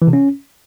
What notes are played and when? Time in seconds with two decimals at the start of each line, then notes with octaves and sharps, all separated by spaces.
0.02 E3
0.07 C3
0.13 C#4